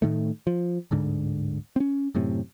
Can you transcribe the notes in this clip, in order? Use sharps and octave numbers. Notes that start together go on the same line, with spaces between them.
A2 D#3 A3
F3
D1 G#2 D3
C4 C#4
F#2 A2 C3